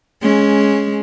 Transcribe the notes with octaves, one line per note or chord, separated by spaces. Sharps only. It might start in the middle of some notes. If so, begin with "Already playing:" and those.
G#3 C#4